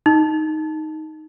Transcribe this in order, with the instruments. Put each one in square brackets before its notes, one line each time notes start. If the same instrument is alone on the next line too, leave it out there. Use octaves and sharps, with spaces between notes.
[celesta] D#4